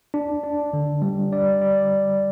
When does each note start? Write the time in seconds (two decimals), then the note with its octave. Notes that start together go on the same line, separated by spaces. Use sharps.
0.14 D4
0.44 D4
0.73 D3
1.02 G3
1.33 D5
1.62 D5